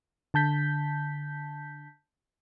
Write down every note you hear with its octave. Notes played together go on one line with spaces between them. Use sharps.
D3 A5 G6 B6